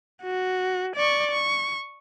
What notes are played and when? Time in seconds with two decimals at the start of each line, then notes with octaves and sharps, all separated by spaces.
0.23 F#4
0.96 D5 C#6
1.31 C#6